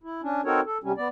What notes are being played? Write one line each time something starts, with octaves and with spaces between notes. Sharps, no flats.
E4
C#4 D4
C4 D#4 F#4 A4 A#4 C#5
A4
C3 G3 C#4
B3 D5